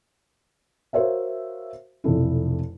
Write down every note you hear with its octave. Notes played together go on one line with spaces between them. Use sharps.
F#4 A#4 C5 C#5 E5 F5
F1 B1 F2 E4